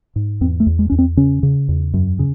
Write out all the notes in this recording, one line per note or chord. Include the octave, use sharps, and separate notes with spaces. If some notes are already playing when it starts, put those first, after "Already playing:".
G#2
E2 C4
A3
E2
G#3
E2 C#4
C4
C#3 C#4
C#3
E2
F#2
C#3